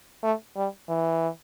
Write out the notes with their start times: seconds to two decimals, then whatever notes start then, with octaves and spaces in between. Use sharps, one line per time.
0.23 A3
0.57 G3
0.89 E3